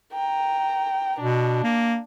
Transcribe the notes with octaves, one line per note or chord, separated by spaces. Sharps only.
G5 A#5
B2 D4
A#3